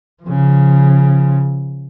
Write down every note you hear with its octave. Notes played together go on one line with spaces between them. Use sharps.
C#3 F3